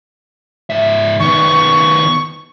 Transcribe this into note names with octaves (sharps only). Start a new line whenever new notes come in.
G#2 E5
D#3 B3 C#6